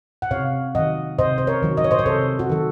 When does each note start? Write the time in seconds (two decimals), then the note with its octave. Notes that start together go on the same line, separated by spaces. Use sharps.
0.22 F#5
0.31 C3 C#5 F5
0.75 D#3 F#3 D#5 F#5
1.19 C3 C5 D#5
1.38 C5
1.47 A#4 C#5
1.63 D#3 F#3
1.77 D#5
1.84 C#5
1.91 C5 D#5
1.99 C#5
2.06 C3 A4 C5
2.39 F#4
2.49 D#3 F#3 A4